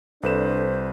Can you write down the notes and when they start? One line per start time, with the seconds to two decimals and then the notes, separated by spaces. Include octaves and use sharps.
0.23 C2 D4 A4 B4 C5 E7